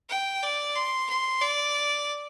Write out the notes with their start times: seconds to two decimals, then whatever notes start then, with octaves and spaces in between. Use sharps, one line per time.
0.09 G5
0.43 D5
0.76 C6
1.09 C6
1.41 D5